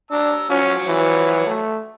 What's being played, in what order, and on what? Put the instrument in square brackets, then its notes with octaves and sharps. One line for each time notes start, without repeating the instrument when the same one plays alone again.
[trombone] D4 [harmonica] A#5 E6
[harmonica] F3 F#3 F#4 [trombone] C#4
[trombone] E3
A3